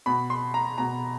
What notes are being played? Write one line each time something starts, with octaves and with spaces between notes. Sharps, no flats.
B2 B5
C6
A#5
B2 A#5